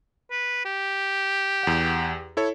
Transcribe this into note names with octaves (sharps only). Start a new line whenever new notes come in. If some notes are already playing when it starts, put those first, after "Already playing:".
B4
G4
E2 F#5
E4 A4 C#5